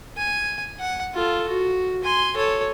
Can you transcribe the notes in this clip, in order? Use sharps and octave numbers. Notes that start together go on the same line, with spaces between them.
G#5
F#5
F4 A4
F#4
G#5 C6
A4 C#5